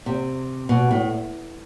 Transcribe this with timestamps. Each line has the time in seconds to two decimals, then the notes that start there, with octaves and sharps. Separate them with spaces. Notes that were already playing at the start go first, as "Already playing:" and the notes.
0.06 C3
0.69 B2
0.91 A2